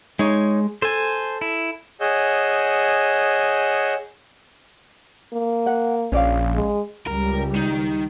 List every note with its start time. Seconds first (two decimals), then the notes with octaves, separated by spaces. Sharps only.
0.19 G#3 D#4 C#5
0.82 A4 C5 G#5
1.41 E4
2.01 G#4 C#5 D#5 F#5 E6 G6
5.33 A#3
5.66 F#5
6.12 A#1 C#4 D5 F5
6.55 G#3
7.07 C#2 G3 A#4
7.56 D#3